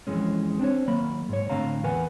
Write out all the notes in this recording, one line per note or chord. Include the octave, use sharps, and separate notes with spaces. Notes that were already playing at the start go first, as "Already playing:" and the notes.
F2 G#2 E3 G#3 C#4
C4 D4 C5 C#5
D#2 F#3 A#3 B5
G#2 C#5
A2 D3 C4 F5 A#5
E2 A#4 B4 F#5 G#5